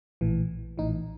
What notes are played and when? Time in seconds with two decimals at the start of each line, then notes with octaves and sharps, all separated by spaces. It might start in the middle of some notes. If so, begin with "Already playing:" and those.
0.21 A#1 A2 E3
0.78 A#1 A2 E3 D#4